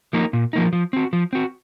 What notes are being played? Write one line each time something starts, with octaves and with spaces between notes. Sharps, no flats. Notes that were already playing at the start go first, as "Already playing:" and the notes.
F3 A#3 D#4
A#2
F3 A#3 D#4
F3
C4 F#4
F3
C4 F#4